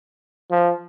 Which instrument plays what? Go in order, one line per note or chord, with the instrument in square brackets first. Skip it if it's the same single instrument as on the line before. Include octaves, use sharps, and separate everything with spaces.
[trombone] F3